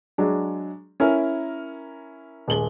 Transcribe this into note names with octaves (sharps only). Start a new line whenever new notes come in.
F#3 G#3 D4
C#4 E4 A#4
D#1 G#3 F#7 G7